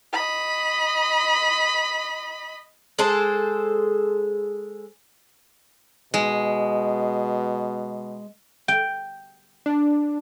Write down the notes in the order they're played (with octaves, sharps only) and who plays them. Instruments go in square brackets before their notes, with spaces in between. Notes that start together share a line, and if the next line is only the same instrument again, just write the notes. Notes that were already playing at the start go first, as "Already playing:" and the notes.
[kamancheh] D#5 B5
[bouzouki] G#3 G#4 A4 C5
[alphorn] B2 [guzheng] G#3
[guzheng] G5
[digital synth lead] D4